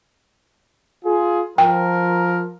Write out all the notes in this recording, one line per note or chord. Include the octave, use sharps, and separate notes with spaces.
F4 G#4
F3 A#4 G5